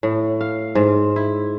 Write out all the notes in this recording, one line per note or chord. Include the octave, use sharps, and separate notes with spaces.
A2
F5
G#2
E4